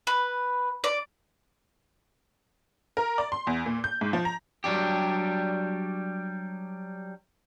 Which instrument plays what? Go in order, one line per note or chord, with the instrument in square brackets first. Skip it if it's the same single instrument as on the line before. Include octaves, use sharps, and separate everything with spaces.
[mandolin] B4
D5
[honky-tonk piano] A#4
D5
C6
E2
A#2
G6
G#2
F3
A#5
[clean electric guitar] F#3 G3 D4 G4